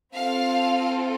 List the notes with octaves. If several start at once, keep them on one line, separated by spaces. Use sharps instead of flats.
C4 F4 A4 F5